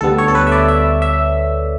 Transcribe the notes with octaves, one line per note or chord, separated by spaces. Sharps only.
D2 D3 G3 B3 A4
C#5
A4
B4
E5
D5
E5
E5